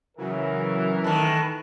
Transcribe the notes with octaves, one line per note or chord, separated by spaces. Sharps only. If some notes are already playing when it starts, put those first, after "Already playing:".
C#3 E3 F#3 A#4
A2 D#3 A5 F#6